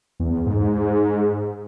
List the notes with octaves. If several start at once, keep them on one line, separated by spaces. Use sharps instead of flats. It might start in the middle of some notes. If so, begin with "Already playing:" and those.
E2
G#2